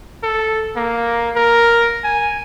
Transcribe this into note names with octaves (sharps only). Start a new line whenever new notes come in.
A4
A#3
A#4
G#5